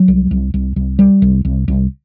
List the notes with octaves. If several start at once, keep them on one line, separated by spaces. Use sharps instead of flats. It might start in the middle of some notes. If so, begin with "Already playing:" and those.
Already playing: F#3
C2
C2
C2
C2
G3
C2
C2
C2